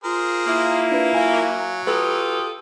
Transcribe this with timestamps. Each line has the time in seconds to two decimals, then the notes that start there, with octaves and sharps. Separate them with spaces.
0.04 F4 G#4 A#4 C5
0.46 A#3 E4
0.92 D4 B4
1.14 F#3 F5 G#5
1.87 F4 G4 A4 B4 D#6